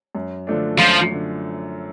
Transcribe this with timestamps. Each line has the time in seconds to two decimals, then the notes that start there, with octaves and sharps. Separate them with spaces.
0.15 F#2
0.47 D3 F3 A3 D4
0.79 F#2 F3
1.11 D3